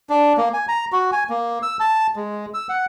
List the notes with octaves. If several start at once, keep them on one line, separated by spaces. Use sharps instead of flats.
D4
A#3
G#5
A#5
F#4
G#5
A#3
E6
A5
G#3
E6
F#5